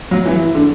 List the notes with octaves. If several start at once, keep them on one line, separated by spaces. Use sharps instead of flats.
F#3
E3
D3